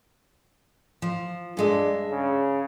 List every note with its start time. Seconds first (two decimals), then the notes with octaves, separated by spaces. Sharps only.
1.02 F3
1.57 G2 G#3 D4 E5
2.10 C#3